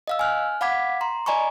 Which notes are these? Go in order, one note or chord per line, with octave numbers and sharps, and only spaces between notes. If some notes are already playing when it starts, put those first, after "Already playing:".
D#5 F5 E6
G#5 F6 F#6
F5 F#5 B5 D6 G#6 B6
A#5 C6
D5 D#5 G#5 A#5 B5 C#6